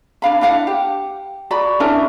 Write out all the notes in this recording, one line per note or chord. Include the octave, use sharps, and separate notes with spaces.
D4 F5 B5
D4 E4 F5 F#5
G4
F#4 D5 B5
C#4 D4 E4 A#4